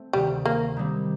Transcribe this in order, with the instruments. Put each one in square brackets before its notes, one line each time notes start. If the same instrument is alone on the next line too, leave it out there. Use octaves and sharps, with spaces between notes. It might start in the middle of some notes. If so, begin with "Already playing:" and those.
Already playing: [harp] A3 C4
[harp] D2 C3 D#3 [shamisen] G3
[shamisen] A#3
[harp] D#3 G3 C4